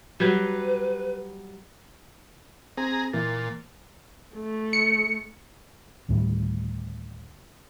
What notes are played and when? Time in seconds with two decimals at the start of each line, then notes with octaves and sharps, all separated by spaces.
0.20 F#3 G3 B4
2.77 C4 G#4 A#5
3.13 A#2 E3 A#3 A6
4.35 A3
4.73 C#7
6.09 D2 A2 D#3 G3